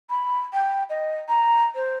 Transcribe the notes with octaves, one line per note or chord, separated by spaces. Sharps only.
B5
G5
D#5
A#5
C5